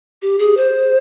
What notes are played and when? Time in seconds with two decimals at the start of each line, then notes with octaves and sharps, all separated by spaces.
0.22 G4
0.39 G#4
0.57 C5